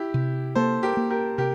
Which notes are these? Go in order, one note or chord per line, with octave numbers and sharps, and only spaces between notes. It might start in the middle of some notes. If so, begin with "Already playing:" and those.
Already playing: E4 G4
C3
A#3 A4 C5
G4 A#4
A#3
G4 A#4
C3 G4 A#4